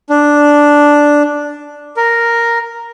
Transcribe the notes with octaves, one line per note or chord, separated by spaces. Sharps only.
D4
A#4